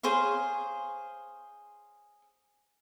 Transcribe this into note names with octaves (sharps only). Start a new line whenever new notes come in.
G#4 C5 C#5 F5